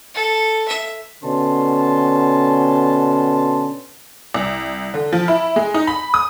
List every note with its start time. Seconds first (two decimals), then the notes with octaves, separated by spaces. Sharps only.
0.15 A4
0.68 E5
1.24 B2 D3 C#4 A5 C6
4.34 C2
4.94 D3
5.13 F3
5.28 E4
5.56 G#3
5.74 D#4
5.87 B5
6.14 D#6